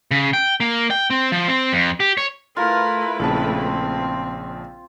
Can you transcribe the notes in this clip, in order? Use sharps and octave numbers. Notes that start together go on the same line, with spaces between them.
C#3
G5
A#3
G5
C4
F3
C4
F2
G4
C#5
A3 E4 F4 A#4 B4
A#1 C#3 C4 A5